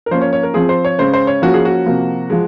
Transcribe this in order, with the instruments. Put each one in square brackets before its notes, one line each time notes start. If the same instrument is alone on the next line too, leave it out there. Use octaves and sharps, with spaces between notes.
[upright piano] A#4
F3 A#3 C#4 C5
C#5
C#5
A#4
F3 C4 G#4
C5
C#5
C#3 G#3 C#4 C5
C5
C#5
F3 A#3 C#4 F#4
G#4
F#4
C3 F3 A#3
F3 G#3